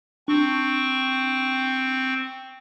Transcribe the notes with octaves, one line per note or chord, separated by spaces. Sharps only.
C4 D4 C#6